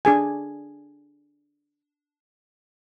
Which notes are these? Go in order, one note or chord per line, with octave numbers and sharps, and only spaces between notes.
D4 G#4 G#5